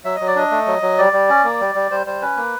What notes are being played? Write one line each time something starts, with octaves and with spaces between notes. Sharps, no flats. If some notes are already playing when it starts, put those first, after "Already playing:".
F#3 E5
F#3 D#5
D5
D4 D#5
A3
F#3
F#3
G3 D5
G3
C#4
A#3
G3
G3
G3 C5
G3 C5
C#4 B4
A#3